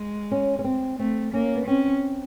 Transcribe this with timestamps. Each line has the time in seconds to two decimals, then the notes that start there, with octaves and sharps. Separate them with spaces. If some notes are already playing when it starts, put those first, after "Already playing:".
Already playing: G#3
0.31 C#4
0.59 C#4
0.64 C4
0.99 A3 C4
1.33 A#3 C#4
1.55 B3
1.66 C4 C#4